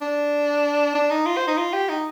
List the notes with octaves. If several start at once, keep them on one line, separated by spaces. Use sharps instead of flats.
D4
D4
D#4
F4
C5
D#4
F4
G4
D#4